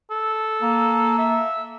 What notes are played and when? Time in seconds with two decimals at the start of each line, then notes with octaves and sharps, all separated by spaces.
0.11 A4
0.62 A#3
1.18 E5